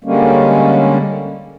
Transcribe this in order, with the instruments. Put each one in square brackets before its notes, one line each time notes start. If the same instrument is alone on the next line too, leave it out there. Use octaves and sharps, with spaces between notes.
[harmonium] D3 G3 G#3 A#3 C#4